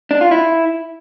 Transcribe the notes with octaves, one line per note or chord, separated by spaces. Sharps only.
D4
F4
E4